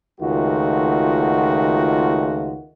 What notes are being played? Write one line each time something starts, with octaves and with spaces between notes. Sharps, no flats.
C#2 D#3 A3 F4 F#4